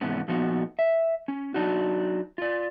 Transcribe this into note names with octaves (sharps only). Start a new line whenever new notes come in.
G#2 C3 E3 B3 C#4
A#2 F3 B3 D#4 F#4
E5
C#4
F#3 D4 D#4 F#4
F4 D5